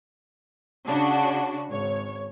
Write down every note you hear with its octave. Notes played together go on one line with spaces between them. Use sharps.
C#3 D4 F#4
G#1 C#5